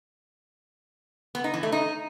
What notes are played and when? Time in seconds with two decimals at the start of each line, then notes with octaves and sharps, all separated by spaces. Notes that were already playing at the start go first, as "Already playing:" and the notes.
1.35 B3
1.44 D#4
1.54 E3
1.63 A3
1.72 D#4